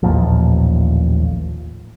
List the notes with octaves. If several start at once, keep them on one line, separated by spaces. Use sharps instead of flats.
A1 D#2 A#2 F3